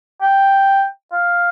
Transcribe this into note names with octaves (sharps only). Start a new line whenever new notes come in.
G5
F5